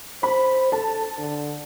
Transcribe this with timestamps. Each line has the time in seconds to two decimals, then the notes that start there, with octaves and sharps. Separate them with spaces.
0.23 C5 B5
0.72 A4 A5
1.18 D3